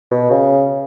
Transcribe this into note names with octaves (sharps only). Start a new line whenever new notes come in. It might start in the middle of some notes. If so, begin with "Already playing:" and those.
B2
C#3